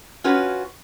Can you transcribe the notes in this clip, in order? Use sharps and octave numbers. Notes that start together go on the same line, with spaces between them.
C#4 F4 F#4 B4 C#5